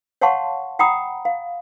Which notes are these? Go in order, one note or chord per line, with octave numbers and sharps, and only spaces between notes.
C#5 F5 F#5 A5 C6 C#6
F#5 G5 A#5 B5 D#6
F5